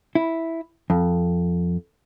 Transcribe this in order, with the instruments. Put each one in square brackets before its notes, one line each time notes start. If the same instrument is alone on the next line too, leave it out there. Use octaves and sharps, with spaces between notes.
[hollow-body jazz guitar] E4
F2